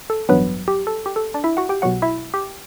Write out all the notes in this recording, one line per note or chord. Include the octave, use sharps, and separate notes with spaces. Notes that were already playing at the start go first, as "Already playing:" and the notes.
A4
A1 G2 F#3 B3 B4
G4
A4
G4
A4
D4 D5
E4 E5
F#4 F#5
G4 G5
B1 B2 F#3 F#4 F#5
E4 E5
G4